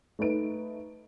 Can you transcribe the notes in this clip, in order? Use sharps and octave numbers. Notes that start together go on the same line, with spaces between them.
A3 D#4 B4 D7